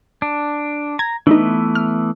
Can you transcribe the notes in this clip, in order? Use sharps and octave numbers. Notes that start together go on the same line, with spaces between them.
D4
A#5 G#6
E3 A3 B3 D4 D#4
F6